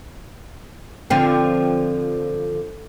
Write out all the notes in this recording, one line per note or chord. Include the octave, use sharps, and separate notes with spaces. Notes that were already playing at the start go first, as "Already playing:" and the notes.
D3 F3 C4